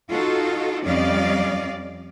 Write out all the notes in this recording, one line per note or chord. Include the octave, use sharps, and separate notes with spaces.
D#4 F4 F#4 A4
F2 G3 C#4 D5 D#5 F5